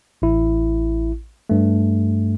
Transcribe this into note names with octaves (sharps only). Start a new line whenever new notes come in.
A1 E4
G2 A3